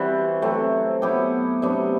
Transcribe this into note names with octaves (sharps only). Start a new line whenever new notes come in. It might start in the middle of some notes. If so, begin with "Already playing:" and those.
Already playing: E3 G3 C4 F#4
F#3 A3 C4
F#3 B3 E4 G4
C3 F#3 B3 D4